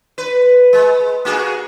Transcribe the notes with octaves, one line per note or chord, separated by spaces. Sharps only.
B4
G#3
A#3 F#4 G#4